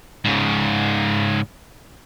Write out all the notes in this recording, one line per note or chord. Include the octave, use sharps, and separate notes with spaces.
G#2 C#3